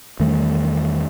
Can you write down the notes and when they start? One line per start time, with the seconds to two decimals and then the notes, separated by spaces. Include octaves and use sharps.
0.20 E2 D#3 G3 A3